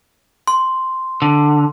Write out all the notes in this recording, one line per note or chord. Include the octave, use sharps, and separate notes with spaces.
C6
D3